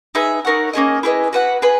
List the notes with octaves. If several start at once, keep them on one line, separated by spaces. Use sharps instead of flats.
D#4 G#4 B4 E5
D#4 A#4 C#5 F#5
A#3 C#4 G#4 D#5
E4 G#4 B4 D#5
F#4 B4 F#5
G#4 B4